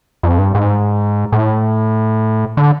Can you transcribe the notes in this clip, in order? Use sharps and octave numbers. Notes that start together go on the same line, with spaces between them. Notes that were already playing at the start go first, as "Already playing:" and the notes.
F2
G2
G#2
A2
D3